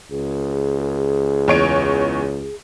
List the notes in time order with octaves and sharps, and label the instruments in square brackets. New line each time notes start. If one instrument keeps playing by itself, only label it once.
[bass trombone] C#2 [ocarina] G#4
[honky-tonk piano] E2 C#5 D7